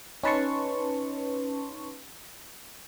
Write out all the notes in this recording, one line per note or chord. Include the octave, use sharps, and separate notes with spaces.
C#4 D#4 B4 A5 C6 C#6